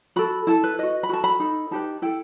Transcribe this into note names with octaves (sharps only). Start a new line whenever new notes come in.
F#4 A4 B5
E4 A4 A5
B4
F#4 B4 D#5
B5
F#4 A4 A5
B5
D#4 A4
D#4 G4 B4 A5
E4 A4 G5